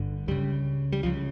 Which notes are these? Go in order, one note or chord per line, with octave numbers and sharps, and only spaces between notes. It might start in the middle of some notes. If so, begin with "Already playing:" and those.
Already playing: G1 G2 D3
C#2 C#3 G3
G3
C#2 C#3 F3